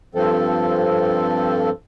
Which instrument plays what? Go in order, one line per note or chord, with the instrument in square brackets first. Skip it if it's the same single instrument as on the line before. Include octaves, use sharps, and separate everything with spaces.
[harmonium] G2 F3 C4 A4